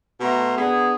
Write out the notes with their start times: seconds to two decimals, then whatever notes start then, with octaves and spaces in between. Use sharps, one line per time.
0.20 B2 A3 A#5 C6
0.56 B3 D4 G#4